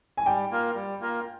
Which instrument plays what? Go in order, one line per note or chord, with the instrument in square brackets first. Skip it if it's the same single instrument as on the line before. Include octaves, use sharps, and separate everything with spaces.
[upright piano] G#5
[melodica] G3 [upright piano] G5
[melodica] A#3 F4 A#4
G3
A#3 F4 A#4